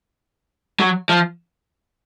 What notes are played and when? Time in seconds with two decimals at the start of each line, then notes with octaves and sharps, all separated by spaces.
0.80 F#3
1.09 F3